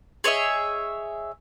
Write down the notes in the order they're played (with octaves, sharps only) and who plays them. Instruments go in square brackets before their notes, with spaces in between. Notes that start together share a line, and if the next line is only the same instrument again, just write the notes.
[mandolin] G#4 C#5 D#5 E5